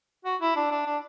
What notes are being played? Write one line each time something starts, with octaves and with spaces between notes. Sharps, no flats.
F#4
E4
D4
D4
D4